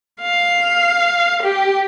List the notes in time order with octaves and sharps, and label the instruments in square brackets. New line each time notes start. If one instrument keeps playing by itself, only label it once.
[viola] F5
G4